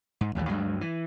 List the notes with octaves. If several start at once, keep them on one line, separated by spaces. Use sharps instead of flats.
G#2
A1 D#2 E3 G3
D2 G2 F#3 G#3
E3